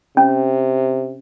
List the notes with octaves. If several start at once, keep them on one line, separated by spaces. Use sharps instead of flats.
C3 C#4